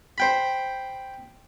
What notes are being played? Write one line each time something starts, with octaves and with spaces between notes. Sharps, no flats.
C5 G5 B5